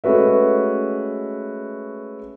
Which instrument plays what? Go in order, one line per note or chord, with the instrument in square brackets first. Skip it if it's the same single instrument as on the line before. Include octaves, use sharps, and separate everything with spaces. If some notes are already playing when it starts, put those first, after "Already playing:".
[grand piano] G#3 A3 C#4 F#4 B4 E5